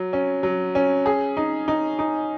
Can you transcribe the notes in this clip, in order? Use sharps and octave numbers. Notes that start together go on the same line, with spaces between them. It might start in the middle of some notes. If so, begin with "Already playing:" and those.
Already playing: F#3
C#4
F#3
C#4
G#4
D#4
D#4
D#4